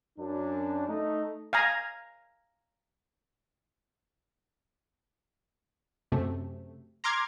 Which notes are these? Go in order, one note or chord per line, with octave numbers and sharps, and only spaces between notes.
F#2 D4
A3 D#4
F5 G#5 A#5
F#2 C3 A3
A#5 C6 D6 F6 G#6